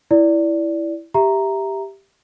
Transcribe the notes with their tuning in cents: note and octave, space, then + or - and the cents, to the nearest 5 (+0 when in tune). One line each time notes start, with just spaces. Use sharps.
E4 +0 D5 -10
G4 +0 E5 +0 A#5 +0